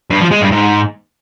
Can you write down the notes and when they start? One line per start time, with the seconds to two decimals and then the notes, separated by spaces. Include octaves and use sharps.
0.10 G2
0.21 F3
0.31 G#3
0.41 G2
0.52 G#2